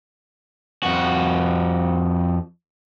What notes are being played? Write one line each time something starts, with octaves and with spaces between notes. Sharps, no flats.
F2 F#4